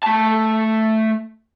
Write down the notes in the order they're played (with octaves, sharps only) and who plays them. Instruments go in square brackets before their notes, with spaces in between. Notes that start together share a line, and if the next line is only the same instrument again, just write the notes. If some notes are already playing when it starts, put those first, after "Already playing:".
[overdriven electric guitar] A3 A5